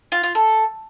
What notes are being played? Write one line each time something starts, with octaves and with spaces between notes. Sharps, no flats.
F4
F4
A4